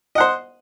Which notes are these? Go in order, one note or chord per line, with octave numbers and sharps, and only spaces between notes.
C5 D#5 F#5